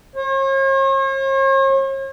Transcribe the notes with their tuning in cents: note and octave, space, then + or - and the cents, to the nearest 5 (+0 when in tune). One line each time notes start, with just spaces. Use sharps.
C#5 -45